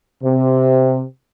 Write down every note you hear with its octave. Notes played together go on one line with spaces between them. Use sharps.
C3